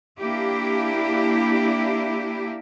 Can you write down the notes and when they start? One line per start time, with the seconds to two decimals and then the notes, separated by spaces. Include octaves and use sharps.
0.18 A#3 D4 E4 G4